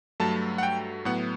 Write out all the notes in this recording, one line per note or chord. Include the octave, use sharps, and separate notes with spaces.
G2 F#3 A3 A5
F#5
G5
A2 F#3 B3 F#5